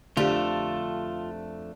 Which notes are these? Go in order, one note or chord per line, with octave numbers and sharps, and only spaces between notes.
F2 D3 A3 D4 F4 G4